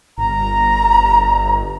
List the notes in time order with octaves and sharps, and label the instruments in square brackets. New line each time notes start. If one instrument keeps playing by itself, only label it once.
[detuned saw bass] G1 [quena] A#5